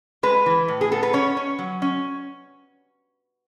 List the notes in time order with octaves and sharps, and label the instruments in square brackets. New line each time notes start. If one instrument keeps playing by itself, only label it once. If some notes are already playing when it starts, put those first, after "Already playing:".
[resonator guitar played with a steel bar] G#3 B4
E3
A2
G#4
B3 A4
B4
C#4 C#5
C#4
F#3
C#4